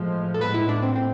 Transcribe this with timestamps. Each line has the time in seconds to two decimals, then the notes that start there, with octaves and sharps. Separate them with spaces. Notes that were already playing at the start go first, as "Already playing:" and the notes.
Already playing: A2 F3 G#3 C5
0.34 A4
0.40 A2 G#3 B3 B4
0.54 E4
0.69 D4
0.82 C4
0.95 C4